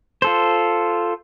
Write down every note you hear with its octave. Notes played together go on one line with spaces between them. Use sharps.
F4 A4 C5